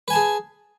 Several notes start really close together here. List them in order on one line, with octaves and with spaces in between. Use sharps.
B4 G#5 A5 G#4